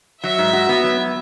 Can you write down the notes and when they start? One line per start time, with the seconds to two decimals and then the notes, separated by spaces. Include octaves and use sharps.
0.23 F#3 E5
0.38 G#2
0.53 F#4
0.69 B3
0.84 F#3